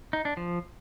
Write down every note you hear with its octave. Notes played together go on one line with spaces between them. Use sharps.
D#4
D4
F3